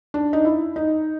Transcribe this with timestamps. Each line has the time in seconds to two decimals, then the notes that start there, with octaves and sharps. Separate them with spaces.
0.14 D4
0.33 D#4
0.45 E4
0.76 D#4